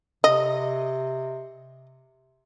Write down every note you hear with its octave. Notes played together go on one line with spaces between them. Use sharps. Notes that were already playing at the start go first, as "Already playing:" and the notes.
C3 D#5